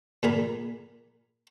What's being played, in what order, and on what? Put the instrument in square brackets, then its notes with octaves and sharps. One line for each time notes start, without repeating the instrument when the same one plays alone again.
[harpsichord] A#2 G#4 A#4 B5